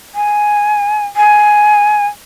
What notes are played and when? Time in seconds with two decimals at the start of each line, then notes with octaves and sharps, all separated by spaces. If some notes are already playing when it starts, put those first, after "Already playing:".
0.15 G#5
1.16 G#5